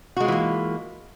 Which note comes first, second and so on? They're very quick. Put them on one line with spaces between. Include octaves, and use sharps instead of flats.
F#4 G#3 F4 E3 A#3